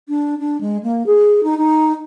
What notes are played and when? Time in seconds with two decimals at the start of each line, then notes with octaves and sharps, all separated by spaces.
0.09 D4
0.39 D4
0.61 G#3
0.83 A#3
1.06 G#4
1.43 D#4
1.57 D#4